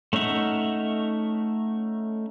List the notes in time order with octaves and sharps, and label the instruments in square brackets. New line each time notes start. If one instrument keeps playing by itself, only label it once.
[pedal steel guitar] A3 C#4 D#4 E5 F#5